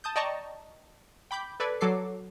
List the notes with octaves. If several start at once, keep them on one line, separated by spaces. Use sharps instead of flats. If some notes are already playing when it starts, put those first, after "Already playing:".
A5 D#6 G6
D5 D#5 G5 A5 A#5 C#6
G5 B5 D6 G6
A4 B4 D5 G#6
F#3 A4 D6 C7